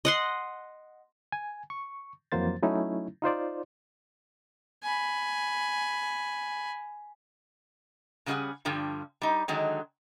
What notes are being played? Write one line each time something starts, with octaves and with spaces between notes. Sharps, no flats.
D#5 F#5 C6
G#5
C#6
F2 E3 F#3 A#3 C5 A6
F#3 A3 C#4 D#4 E4
D#4 F4 C5 D5
G#5 B5
C#3 G3 C#4 F4 G#4 F#5
G2 D3 F3 G3
G3 D#4
D3 D#3 F#3 G#3